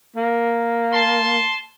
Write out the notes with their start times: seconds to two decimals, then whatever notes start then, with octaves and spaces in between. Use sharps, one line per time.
0.16 A#3
0.92 A5 C6